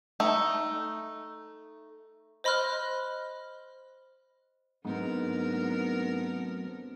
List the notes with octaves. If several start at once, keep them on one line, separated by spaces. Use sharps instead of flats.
A3 D#4
C5 D#5 B5 C6 F6 F#6
G#2 F#3 A3 B3 C4 D4 A#4